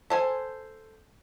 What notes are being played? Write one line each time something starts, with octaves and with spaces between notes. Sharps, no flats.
A4 C5 G#5